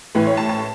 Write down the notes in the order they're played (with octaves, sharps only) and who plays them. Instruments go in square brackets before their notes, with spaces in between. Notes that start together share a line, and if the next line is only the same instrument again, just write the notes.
[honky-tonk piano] A1 A2 E3 B4
C#5
A5
A5